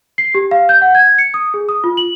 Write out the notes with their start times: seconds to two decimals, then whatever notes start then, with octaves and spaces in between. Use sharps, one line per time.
0.18 C7
0.35 G4
0.51 F5
0.69 G6
0.82 F#5
0.95 G#6
1.18 C#7
1.34 D#6
1.54 G#4
1.69 D#6
1.84 F4
1.97 F#7